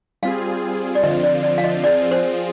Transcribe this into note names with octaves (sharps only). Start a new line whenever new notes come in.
G3 C4 F4 G#4 F5
D5
D3 F3 C4 F4 D#5
D5
D5
F5
D#5
F3 C4 F4 G#4 D5
C5